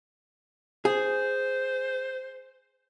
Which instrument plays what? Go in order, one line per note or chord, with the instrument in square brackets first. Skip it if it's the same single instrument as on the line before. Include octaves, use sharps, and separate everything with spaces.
[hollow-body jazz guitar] G#4 [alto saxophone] C5